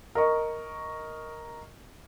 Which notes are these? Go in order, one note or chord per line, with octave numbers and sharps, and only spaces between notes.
A#4 D#5 C#6